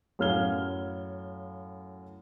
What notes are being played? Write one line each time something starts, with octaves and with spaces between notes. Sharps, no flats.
F#2 A2 F5 F6 G#6 G7